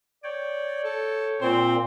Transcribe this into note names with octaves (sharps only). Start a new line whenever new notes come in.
C#5 D5 G5
A4
A#2 C4 C5